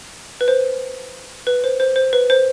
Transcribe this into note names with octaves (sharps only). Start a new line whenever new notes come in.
B4
C5
B4
C5
C5
C5
B4
C5